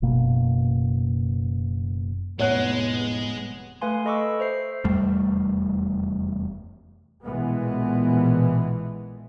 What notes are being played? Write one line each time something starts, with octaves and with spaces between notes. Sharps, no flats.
F#1 B2 A#3
F1 A2 G#3 B3 C#5 F#5 F#6
A3 B4 F5 G#5 C6
A4 D#5 B5 C#6 D6 E6
C5 E5 C7
F1 E2 G3 A3
A#1 B2 E3 G#3 B3